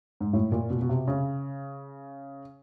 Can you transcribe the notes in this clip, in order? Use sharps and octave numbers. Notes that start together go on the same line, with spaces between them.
G#2
A2
A#2
B2
B2
C3
C#3